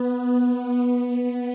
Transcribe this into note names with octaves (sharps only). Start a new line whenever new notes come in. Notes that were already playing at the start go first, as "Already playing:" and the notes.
Already playing: B3
B3